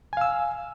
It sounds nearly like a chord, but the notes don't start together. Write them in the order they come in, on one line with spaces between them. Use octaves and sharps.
G#5 F5 E6